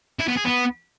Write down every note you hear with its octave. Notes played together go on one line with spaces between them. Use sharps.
E4
B3
G#4
B3